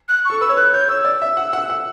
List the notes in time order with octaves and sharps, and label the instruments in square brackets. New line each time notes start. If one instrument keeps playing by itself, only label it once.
[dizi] F#6
[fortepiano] A4 [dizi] C#6
[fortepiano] B4 [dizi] E6
[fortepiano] C#5
[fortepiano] B4 [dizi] F#6
[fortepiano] C#5 [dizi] G6
[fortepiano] C#5 [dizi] E6
[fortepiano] D5
E5
F#5
F#5
F#5